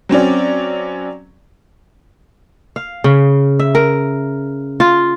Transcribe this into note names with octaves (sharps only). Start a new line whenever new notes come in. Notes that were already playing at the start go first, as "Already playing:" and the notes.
F#3 C4 C#4 D5
F5
C#3
E5
A#4
F4